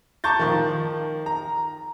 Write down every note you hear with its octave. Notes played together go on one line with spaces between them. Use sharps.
A5 A#5 C#6 D6 G6 A6
D#3 F3
A#5